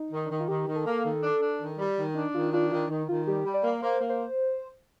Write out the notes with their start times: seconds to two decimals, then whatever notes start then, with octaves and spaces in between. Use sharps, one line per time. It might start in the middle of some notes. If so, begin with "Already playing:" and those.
Already playing: D#4
0.12 D#3
0.25 D4
0.30 D#3 D#4
0.40 F4
0.48 D#3 G4
0.67 D#3
0.76 A4
0.86 A#3
1.04 D#3
1.23 D4
1.41 D4
1.60 D#3
1.78 G3
1.97 D#3
2.15 D4 D#4
2.34 D#3 F4
2.52 D4 F4
2.71 D#3 F4
2.89 D#3 D#4
3.08 D#3 F4
3.27 G3 G4
3.45 G3
3.54 D5
3.64 A#3
3.82 A#3 C5
4.01 A#3
4.09 C5